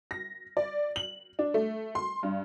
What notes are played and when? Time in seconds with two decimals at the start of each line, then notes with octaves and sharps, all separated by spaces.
0.11 A#6
0.57 D5
0.96 F#7
1.39 D4
1.54 A3
1.95 C6
2.23 G2